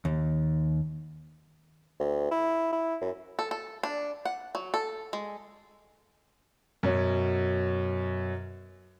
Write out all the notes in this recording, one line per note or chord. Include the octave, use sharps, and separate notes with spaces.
D#2
D2
E4
E4
F#2
A4
A4
D4
F#5
F#3
A4
G#3
F#2 B2 F#3 C#4